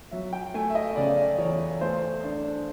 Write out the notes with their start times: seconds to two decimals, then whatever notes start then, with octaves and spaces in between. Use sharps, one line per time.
0.11 F#3 E5
0.33 G5
0.54 A3 G#5
0.70 E5
0.75 D#5
0.96 C#3 D5
1.38 E2 C#5
1.81 A3 C5
2.24 D4